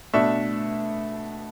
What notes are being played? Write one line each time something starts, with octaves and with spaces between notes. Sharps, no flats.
B2 A3 D4 E5